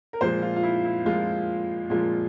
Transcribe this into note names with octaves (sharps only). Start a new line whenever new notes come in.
A#4
A#2 F3 G#3 C5
F4
F4
E4
E4
A#2 F3 G#3 F4
A#2 F3 G#3